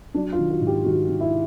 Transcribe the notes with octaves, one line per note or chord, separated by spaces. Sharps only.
F#3 D4
F4
D#3
F#4
G#2
G4
D#3 F#4
D#3
E4